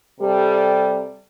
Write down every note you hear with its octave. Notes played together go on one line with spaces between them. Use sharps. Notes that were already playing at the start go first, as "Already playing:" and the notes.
C3 G3 A4